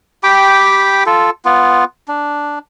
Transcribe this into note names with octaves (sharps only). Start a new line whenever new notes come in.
G4 G5 B5 D6
F4 A4
B3 F4
D4